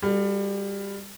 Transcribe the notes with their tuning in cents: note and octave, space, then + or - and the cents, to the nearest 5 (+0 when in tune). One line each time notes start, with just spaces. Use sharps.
G3 +25 F#4 +0 A4 +0